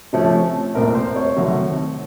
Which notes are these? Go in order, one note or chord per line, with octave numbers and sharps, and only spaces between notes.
C3 F3 A3 C#4
C2 A#2 A3 C4 A#4
C5
C#5
C2 C3 D#3 F#3 A3